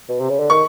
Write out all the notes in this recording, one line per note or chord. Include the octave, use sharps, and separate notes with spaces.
B2
C3
C#3
D3
D#3 C#6